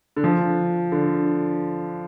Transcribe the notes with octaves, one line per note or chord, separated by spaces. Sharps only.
D3
F3
D3